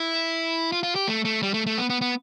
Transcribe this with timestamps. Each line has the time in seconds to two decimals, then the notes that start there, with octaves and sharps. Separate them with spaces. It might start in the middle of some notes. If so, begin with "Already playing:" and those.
Already playing: E4
0.72 F4
0.83 F4
0.95 G4
1.08 A3
1.25 A3
1.42 G3
1.54 A3
1.66 A3
1.78 B3
1.90 B3
2.01 B3